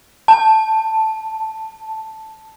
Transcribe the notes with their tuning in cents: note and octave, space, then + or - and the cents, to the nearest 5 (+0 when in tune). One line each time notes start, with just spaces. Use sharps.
A5 +0